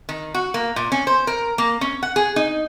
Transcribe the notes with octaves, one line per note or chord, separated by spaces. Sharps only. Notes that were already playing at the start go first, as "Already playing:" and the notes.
D#3
F#4
A#3
A#2
C#4
C5
A#4
A#3
C#4
F#5
G#4
D#4